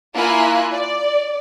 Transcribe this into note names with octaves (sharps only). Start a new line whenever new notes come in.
A#3 E4 F4 G#5 F#6
D5